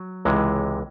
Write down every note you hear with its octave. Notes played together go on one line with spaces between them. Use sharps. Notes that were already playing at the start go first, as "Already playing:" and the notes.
Already playing: F#3
C#2 C3 E3 G#3